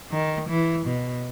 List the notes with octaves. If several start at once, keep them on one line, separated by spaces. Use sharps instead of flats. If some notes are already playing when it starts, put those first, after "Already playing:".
D#3
E3
B2